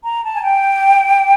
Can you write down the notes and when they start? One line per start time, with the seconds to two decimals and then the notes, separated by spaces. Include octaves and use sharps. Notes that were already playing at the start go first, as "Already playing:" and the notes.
0.05 A#5
0.22 A5
0.34 G#5
0.41 G5